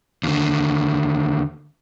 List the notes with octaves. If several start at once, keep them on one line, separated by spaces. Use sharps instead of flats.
D#2 D3